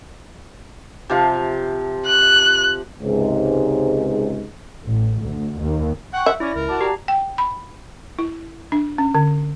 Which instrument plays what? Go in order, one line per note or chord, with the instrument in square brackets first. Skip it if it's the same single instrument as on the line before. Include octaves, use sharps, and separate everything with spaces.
[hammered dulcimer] C3 F3 F5
[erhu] F#6
[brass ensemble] C#2 G#2 C3
[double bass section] A1
D2
D#2
[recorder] F#5 [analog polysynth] G5 C#6 F#6
[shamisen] E5
[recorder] C#4 [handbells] E4 [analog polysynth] D5 A#6
[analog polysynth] C#2 [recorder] A#4
[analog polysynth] F#4 D5 A5
[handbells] G4 A#5
[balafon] G5
B5
E4
D4
C#4
D3